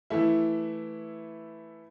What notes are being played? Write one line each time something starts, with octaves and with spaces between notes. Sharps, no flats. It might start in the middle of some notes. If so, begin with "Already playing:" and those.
E3 A3 E4